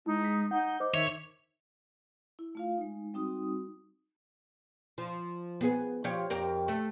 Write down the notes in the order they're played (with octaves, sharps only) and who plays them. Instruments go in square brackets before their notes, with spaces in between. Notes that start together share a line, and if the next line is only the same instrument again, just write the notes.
[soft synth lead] G#3 [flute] D#4 [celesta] E4
[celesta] B6
[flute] D#4 [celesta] F#5 [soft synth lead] G6
[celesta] C5 D#5 D6
[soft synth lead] D#3 [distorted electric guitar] C#5 [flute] E5
[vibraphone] E4
A3 F4 F5
G#3 D#4
G3 C4 D#4 F#4 D#6
[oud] F3
B3 G#4
F3 G4 C#5
F2 G4 A#4
A3